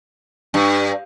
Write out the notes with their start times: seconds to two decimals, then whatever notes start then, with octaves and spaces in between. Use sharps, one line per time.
0.54 G2